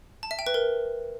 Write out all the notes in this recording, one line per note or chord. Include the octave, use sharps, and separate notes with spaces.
A5
E5
G5
B4
A#4